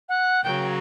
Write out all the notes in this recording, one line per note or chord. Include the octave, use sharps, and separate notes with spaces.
F#5
C#3 F#3 A#3 G5